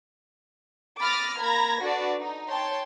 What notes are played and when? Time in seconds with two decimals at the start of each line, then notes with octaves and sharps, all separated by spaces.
1.00 B5 D6 D#6 F6 A6 A#6
1.41 A#3 A#5 B5 G#6 A#6
1.82 D4 F#4 A4 B4 D5
2.19 D#4
2.49 C#5 G5 A5 C6